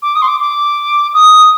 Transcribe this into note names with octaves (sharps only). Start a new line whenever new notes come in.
D6
D#6
C6
D6
D6
D#6